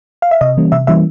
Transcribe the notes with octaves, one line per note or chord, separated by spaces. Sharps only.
F5
E5
C3 D#5
E3 G3 A#3 C#4
C3 E5
E3 G3 A#3 C#4 E5